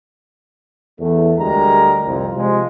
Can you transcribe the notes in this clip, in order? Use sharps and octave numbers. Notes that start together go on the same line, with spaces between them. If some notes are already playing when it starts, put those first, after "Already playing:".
E2 A3
D2 G3 G#3 A#4 A#5
C2 F2
C3 F3 G#3